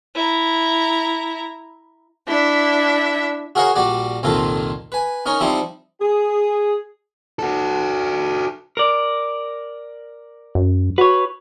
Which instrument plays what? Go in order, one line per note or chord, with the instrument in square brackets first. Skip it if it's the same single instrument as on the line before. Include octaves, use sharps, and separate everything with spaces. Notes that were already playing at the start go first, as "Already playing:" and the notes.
[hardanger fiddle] E4 A#5
[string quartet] D4 E4 E5
[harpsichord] F#4 G#4 A#4 C#5 F5 F#5
A#1 G3 F#4 D5
C2 F2 A#2 D#3 F4 A4
B4 G#5
C#4 D#4 A#4 C#5
F3 G3 C4 D#4 E4
[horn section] G#4
[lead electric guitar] F#4 A4
[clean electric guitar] A#4 D5
[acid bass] F#2
[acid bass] F#4 [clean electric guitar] B4 C#5